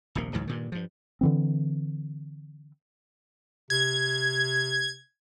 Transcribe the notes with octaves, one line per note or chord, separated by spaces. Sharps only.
D#1 A#1 C3 A#3
C#2 G#2 E3 F#3
G2 A#2 D#3
G2 F3
D3 E3 C4
C3 G#6